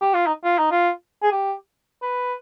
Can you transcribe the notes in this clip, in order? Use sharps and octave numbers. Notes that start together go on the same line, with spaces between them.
G4
F4
D#4
F4
D#4
F4
G#4
G4
B4